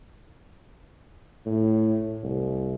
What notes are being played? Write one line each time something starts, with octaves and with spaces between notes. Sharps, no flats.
A2
C2